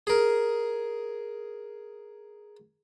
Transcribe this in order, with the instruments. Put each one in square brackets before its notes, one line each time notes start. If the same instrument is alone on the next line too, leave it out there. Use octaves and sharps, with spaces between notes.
[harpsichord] G#4 A#4